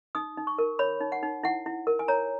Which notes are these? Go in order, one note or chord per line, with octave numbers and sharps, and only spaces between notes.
D#4 D#6
D#4
C#6
A#4
C#5 B5
D#4
F#5
D#4
E4 F#5
E4
A#4
G#5
C#5 A#5